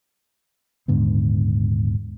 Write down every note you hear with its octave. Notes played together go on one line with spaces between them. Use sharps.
D#1 G#2 D3 B3